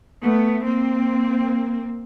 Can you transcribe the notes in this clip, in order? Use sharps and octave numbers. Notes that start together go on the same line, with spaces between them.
A3 B3
A#3 C4